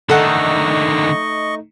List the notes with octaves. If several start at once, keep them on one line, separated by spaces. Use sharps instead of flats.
D3 D#3 A3 D#4 A4 D#5 F#5 C#6